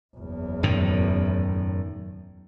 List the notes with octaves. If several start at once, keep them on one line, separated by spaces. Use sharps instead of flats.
F#1 E2
F#2 A2 D#3